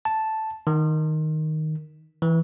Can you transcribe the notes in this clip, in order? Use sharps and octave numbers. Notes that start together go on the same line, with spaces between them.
A5
D#3
E3